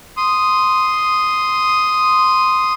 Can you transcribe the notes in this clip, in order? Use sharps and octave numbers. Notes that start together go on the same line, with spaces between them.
C6 D#6